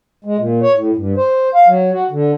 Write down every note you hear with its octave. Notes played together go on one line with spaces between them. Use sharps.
G#3
A#2
C#5
A2
G2
C5
F5
F#3
F#4
D3